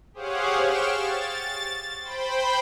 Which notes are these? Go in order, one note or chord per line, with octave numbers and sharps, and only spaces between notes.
G4 G#4 C5 C#5 F5 F#5
G5 C#6 F6 D7 E7
A6
C5 G5 B5